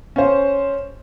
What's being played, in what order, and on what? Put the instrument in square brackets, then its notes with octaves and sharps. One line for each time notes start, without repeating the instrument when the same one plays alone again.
[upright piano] C#4 C5